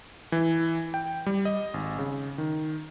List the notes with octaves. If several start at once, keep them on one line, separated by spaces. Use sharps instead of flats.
E3
G5
G3
D#5
G#1
C#3
D#3